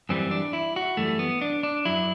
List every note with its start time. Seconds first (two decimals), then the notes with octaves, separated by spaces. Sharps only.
0.09 F#2 E3 G3 C4
0.31 D4
0.53 E4
0.76 F#4
0.97 F#2 E3 G3 A3
1.19 B3
1.41 D4
1.63 D4
1.85 F#2 F#3 E4